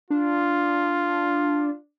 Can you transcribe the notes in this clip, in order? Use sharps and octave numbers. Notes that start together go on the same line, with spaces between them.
D4 F4